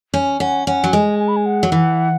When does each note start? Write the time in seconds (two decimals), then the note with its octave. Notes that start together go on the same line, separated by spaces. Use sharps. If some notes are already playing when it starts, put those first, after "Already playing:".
0.14 C#4
0.40 C#4 F#5
0.67 C#4 F#5
0.84 F#3
0.93 G#3 G#5
1.19 G#5
1.28 B5
1.36 G#5
1.46 F#5
1.63 F#3
1.72 E3